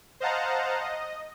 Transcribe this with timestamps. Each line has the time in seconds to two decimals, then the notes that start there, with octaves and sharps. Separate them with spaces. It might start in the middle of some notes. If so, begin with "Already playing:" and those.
0.20 C5 D#5 F5 F#5 A5 A#5
0.81 D#5